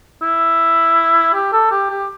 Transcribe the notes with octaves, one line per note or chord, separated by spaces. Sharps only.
E4
G4
A4
G4
G4